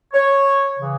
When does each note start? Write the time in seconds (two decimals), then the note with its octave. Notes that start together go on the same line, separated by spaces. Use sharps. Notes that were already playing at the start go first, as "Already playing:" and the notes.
0.13 C#5
0.78 C#3 E3